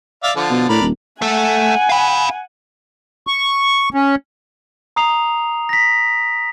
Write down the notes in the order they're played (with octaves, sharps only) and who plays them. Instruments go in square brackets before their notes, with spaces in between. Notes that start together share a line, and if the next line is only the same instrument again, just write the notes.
[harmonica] D5 E5 F5
D3 F3 A4
[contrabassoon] B2
[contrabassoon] A2 [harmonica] D4 A#4 B5
[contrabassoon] D#1
[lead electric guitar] A3 A4 [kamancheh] F#5 G#5
[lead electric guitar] F5 B5
[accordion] C#6
C#4
[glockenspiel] A#5 D#6 C7 F7
A#6 B6